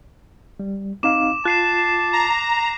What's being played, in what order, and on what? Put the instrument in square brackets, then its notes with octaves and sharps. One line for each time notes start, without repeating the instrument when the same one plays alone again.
[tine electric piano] G3
[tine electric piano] C4 D#4 F5 [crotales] D6 E7
[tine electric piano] F4 [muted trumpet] A5 [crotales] F#6 C7 E7
[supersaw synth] A#5